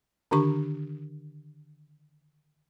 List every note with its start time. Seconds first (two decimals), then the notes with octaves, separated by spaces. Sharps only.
0.31 D3 D#3 D4 G4 C#6